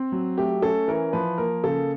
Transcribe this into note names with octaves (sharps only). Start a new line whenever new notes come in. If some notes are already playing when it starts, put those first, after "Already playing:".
Already playing: C4
F#3
A3 G4
C#4 A4
E3 A#4
F3 B4
A#3 A#4
C#3 A4